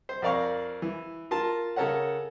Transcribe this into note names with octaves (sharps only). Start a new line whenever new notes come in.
C5
F2 A#4 D5 F5 C#6
E3
F4 A#4 A5
C#3 A4 A#4 C#5 F#5